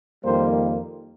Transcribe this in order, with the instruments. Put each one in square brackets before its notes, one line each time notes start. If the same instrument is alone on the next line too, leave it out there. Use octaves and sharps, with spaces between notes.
[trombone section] F2 D#3 G3 A#3 C5